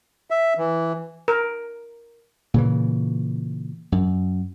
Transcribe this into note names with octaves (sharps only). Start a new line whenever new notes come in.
E5
E3
A#4
A#2 C#3 E3
F#2